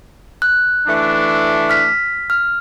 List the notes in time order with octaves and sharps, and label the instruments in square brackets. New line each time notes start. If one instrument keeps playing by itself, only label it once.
[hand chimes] F#6
[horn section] E3 A3 D4
[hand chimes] F6 B6
F6